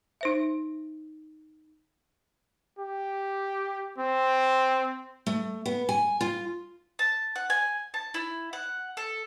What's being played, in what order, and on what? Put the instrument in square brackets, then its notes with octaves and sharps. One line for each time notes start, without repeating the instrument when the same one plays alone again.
[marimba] D#4 C5 E5
[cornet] G4
C4
[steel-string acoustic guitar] A3
B3
G#5
F4
[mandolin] A5
F#5
G#5
A5
E4
F#5
A4